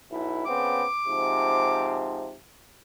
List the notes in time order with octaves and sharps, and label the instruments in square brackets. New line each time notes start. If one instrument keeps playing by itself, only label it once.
[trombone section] B1 E4
[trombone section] C#3 B3 C4 [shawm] D6
[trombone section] G#2 C3 F3